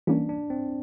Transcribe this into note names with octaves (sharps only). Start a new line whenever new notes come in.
E3 G3 A#3 C#4 D4
D4
C4